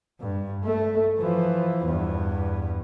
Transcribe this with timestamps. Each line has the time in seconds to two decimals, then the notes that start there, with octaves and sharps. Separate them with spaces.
0.20 G2
0.63 A3
1.19 E3 F3
1.84 E2 G2